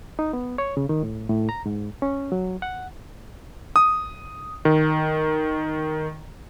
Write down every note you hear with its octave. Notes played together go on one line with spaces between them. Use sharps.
D#4
B3
C#5
C#3
D#3
A2
A2
A#5
G#2
C#4
F#3
F#5
D#6
D#3